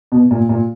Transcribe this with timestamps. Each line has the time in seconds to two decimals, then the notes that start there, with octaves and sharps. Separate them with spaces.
0.12 B2
0.31 A#2
0.49 A#2